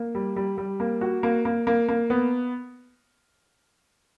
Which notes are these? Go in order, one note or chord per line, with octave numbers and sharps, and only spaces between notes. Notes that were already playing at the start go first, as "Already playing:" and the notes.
Already playing: A#3
G3
G3
G3
A#3
F#4
A#3
A#3
A#3
A#3
B3